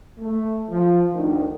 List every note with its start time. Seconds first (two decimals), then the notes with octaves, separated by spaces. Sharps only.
0.19 A3
0.70 F3
1.14 D2 D#3